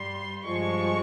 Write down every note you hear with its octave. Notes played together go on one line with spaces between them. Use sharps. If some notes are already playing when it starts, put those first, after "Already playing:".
Already playing: G2 G3 C6
G2 F3 G#3 C#6